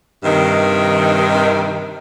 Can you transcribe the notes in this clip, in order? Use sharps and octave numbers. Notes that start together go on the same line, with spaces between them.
G2 C3 D#3